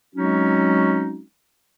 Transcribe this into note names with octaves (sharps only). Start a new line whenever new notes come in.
F#3 G#3 C4 C#4 D#4 F#4